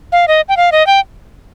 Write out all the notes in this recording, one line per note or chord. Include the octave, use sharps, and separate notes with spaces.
F5
D#5
G5
F5
D#5
G5